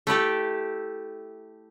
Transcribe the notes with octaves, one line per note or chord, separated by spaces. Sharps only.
A3 E4 G4 A4